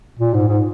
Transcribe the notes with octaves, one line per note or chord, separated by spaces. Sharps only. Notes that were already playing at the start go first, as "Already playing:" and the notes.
A#2
G#2
G#2